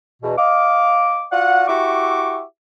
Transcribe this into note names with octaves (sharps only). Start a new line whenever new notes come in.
E2 B2
D#5 F5 D6
F4 F#4 D5 F5 F#5
E4 F#4 G4 E5 C#6 D6